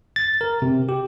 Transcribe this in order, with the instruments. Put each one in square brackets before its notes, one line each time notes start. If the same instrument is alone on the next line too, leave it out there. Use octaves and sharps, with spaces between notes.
[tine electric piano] A6
A#4
C3
G4